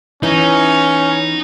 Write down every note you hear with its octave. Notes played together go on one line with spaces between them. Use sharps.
E3 B3 C#4 D#4